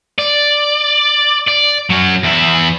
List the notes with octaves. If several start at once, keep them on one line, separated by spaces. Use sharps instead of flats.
D5
D5
F#3 C#4
E2 E4